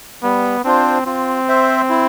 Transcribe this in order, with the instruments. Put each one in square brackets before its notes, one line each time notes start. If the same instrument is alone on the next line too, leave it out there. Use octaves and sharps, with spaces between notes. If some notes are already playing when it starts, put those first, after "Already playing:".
[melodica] G3 [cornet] B3
[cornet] C4 [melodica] D4 F4 C5
[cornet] C4 [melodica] F4
[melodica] C5 E5
E4